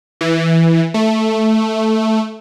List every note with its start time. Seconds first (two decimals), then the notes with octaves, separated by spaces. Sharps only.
0.21 E3
0.94 A3